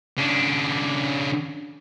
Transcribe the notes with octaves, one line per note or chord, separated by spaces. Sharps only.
C#3 D4